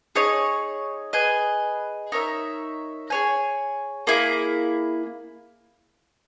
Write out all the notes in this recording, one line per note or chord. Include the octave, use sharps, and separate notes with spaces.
D#4 G#4 C#5
G#4 B4 D#5 G#5
D#4 A#4 C#5 E5
G#4 C#5 G#5
A#3 E4 G#4